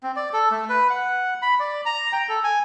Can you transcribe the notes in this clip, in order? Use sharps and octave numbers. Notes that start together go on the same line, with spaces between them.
C4
D5
A4
A3
B4
F#5
B5
D5
A#5
G5
A4
G#5